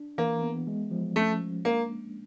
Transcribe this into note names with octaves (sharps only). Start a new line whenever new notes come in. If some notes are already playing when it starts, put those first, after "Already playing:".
Already playing: D4
E3 A#3
B3
G#3
F3
A3 C#4
G#3
A#3 D4
A#3